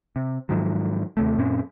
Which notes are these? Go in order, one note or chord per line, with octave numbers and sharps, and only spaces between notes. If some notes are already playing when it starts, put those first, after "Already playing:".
C3
G#2 D#3 F3 F#3
D#2 C3 A3
F#2 A#2 C4 C#4